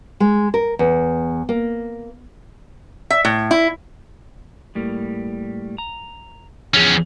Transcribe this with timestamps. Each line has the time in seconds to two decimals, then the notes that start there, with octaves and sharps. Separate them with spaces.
0.20 G#3
0.54 A#4
0.79 E2
1.49 A#3
3.10 E5
3.25 A2
3.51 E4
4.75 A2 G3 A#3
5.78 A#5
6.74 E2 F3 C#4 G#4